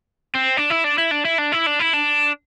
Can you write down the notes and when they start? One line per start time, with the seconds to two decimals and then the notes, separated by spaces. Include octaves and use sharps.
0.35 C4
0.57 D4
0.70 E4
0.84 D4
0.98 E4
1.11 D4
1.25 E4
1.39 D4
1.52 E4
1.67 D4
1.80 E4
1.94 D4